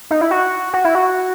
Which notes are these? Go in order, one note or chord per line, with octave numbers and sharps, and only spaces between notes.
D#4
E4
F#4
F#4
E4
F#4